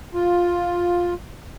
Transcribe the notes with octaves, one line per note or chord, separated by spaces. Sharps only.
F4